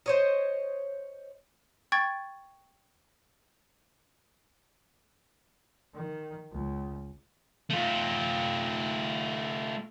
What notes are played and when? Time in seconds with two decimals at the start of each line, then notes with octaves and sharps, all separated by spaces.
0.06 C5 C#5 D#5
1.92 G5 C#6 G#6 A6
5.94 D#3
6.52 C#2
7.70 A3 F4